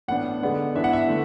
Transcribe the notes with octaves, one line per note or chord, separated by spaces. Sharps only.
A2 E3 B3 D4 F#5
D3 G#3 B3 D4
E3 B3 D4 E5
F#5
E5
D3 A3